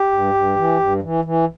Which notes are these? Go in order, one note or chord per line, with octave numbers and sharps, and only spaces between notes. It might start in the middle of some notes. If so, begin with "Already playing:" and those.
Already playing: G4
G2
G2
E3
G2
E3
E3